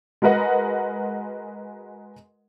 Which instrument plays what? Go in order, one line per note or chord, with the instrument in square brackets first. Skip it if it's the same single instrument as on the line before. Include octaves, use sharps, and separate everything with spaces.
[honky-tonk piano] G#3 F#4 A#4 B4 D#5 F#5